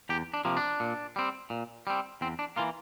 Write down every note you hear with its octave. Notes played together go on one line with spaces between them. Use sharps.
E2 G4
D4
C3 F3 A#3
D4
A#2
G3 C4
A#2
G3 C4
E2 C4
D4
E3 A#3 F4